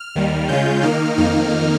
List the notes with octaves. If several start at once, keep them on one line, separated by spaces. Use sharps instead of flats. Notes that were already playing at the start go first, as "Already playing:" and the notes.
Already playing: F6
D#2 D#3 G3
C#3 G#3 C#4 F4 G6
D#3 A#3 D#4 F6
F2 D#3 A#3 D#4 F6